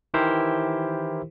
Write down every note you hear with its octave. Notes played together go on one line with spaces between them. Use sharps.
D#3 E3 E4 G4 A#4 C5